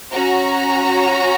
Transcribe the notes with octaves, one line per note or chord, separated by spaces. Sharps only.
C#4 F#4 A#5